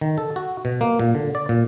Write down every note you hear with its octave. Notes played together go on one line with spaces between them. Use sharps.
D#3
A4
F#4
B2
A#3
A#2
D3
D5
A#2